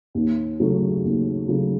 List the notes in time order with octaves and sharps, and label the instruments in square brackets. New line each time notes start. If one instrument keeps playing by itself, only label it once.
[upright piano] D#2
C#3 F#3 A3
D#2
C#3 F#3 A3